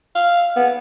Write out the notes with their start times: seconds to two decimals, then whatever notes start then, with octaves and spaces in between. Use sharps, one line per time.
0.15 F5
0.56 B3